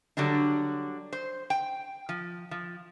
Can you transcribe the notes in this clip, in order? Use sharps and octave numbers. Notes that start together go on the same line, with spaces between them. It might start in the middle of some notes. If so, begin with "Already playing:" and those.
D3 F#3 G3 D4
C5
G5
F3
F3